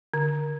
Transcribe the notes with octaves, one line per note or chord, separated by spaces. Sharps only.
D3